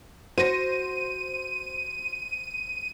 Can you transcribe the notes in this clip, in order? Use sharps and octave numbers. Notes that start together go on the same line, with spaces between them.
F#4 C5 A#6 D#7